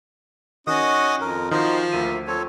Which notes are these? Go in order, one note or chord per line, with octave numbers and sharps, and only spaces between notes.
D#3 C#4 F#4 D#5 D#6
F2 A#4
D#3 F3 D#4 F#4 A#4 C5 D#5
D2 A#3 E5 D#7
F3 C4 A4 C#5